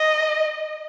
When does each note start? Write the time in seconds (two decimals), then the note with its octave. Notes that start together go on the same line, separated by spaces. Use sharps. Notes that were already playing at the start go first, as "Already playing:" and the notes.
Already playing: D#5